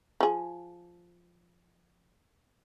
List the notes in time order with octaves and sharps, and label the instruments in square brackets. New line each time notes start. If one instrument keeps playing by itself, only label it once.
[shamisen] F3 G#4